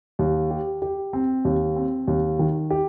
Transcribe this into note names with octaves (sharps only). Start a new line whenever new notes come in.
D#2
G4
G4
C4
D#2
C4
D#2
D#3
G4